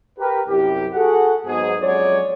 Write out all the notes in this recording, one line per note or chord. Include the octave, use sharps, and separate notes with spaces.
G4 A#4 B4
C2 F#2 G4
F#4 G#4 A4 F#5
G#2 F#3 B3 G#4
F2 F#3 G#3 C#4 C#5 D5